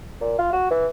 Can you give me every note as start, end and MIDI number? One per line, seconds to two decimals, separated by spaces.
0.21 0.37 46
0.39 0.52 65
0.53 0.69 66
0.71 0.87 52